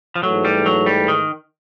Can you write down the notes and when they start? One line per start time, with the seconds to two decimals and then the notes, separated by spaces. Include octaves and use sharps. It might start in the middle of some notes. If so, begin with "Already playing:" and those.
0.16 F3
0.23 G#2 E3 F#3 A3
0.45 G3
0.66 F#3
0.86 G3
1.08 D#3